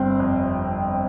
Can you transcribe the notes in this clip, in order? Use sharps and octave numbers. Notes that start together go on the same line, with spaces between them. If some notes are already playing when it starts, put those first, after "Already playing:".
Already playing: G1 C4
F2